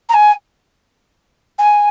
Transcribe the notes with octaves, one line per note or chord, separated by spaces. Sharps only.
A#5
G#5
G#5